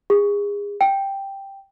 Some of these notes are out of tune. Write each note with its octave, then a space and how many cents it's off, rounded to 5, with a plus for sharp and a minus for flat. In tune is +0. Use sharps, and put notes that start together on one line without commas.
G#4 -30
G5 +0